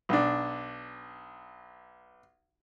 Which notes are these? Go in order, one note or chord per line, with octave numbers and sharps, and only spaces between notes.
B1 D4